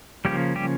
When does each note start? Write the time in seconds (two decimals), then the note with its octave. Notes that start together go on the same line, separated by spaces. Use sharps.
0.25 C#3 F3 G3 A#3 C#4 G4
0.56 G3 G4